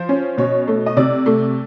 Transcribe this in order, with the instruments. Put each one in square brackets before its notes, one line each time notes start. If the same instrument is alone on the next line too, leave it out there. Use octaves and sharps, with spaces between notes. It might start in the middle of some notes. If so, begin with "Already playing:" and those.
Already playing: [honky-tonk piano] F3 C5
C#4
B2 C#5
A3
D#5
C3 D5
A3